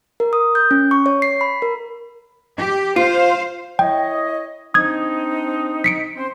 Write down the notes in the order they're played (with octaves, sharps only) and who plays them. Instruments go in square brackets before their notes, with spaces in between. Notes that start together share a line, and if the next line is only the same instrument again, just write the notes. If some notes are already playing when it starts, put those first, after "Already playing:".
[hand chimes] A#4
D#6
G6
C#4
C#6
C#5
C7
B5
A#4
[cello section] G4
[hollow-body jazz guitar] F4 [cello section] C5 F5
[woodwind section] E4 C#5 D#5 [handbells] G5
[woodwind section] C4 D4 D#4 [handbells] D#6 G#6
[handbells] B6 C#7 D7
[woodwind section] C4 C#4 C5